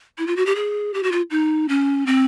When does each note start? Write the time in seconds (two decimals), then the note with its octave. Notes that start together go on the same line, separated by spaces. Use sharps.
0.18 E4
0.27 F4
0.36 F#4
0.46 G4
0.56 G#4
0.94 G4
1.03 F#4
1.12 F4
1.31 D#4
1.69 C#4
2.06 C4